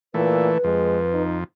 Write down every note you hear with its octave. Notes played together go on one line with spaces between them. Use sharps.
A#2 E3 A3 B4
F2 G#3
D#4